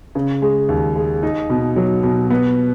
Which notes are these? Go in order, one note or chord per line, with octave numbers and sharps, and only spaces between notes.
C#3
G#3
D#2
G#3
D#4
B2
F#3
B2
B3